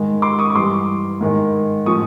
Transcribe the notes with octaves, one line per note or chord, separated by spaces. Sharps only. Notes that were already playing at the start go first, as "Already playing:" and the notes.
Already playing: G#2 D#3 G#3
C6 D6
C#6 D#6
C#6
G2 E3 G3 C6 D6
G#2 D#3 G#3
A2 F3 G#3 C#6 D#6